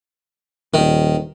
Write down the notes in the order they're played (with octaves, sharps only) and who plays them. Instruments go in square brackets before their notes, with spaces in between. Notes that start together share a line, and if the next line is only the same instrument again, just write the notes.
[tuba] D#1 [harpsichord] D#3